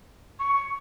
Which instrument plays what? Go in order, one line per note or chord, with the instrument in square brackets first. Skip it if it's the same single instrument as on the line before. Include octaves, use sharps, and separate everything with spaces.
[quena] C#6